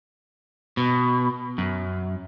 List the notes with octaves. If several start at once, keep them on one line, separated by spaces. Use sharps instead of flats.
B2
F#2